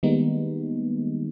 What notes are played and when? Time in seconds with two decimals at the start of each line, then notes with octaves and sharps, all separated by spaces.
0.03 D#3 G3 G#3 A#3 B3 D#4